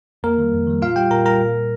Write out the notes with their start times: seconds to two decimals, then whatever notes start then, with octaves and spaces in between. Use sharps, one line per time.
0.23 F2 A#3 A#4
0.38 D#3 G3
0.53 F2
0.67 D#3 G3
0.82 A#2 F4 F5
0.96 G3 G4 G5
1.11 A#2 A#4 A#5
1.26 G3 A#4 A#5
1.41 A#2
1.55 G3